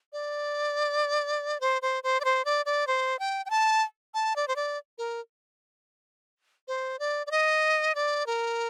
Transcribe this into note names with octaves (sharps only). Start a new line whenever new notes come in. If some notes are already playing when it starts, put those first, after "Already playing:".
D5
C5
C5
C5
D5
C5
D5
D5
C5
G5
G5
A5
A5
D5
C5
D5
A#4
C5
D5
D5
D#5
D5
A#4